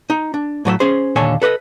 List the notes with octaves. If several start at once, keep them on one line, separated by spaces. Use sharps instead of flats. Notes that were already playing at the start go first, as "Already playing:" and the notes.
D#4
D4
A2 F#3 D5 E5
C#4 G#4 C5
D#2 A#2 D3 A4 C#5 G#5
A4 B4 D5 D#5